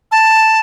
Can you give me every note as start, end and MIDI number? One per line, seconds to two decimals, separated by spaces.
0.12 0.60 81